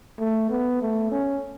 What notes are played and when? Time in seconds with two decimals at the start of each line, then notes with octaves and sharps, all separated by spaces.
0.19 A3
0.50 B3
0.82 A3
1.12 C#4